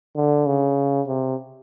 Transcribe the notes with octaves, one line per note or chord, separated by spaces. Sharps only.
D3
C#3
C3